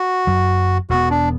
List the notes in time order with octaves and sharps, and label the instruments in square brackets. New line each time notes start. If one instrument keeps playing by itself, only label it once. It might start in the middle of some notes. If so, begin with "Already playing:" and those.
Already playing: [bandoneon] F#4
[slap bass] F#1 F#2 F#3
[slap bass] E1 E2 E3 B3 [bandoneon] F#4
[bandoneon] D4